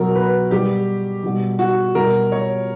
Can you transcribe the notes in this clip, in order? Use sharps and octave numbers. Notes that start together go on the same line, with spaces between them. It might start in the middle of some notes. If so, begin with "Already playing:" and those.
Already playing: B2 F#3 A#4
B4
B2 G3 G4
B2 G3
F#4
B2 G3 A#4
C#5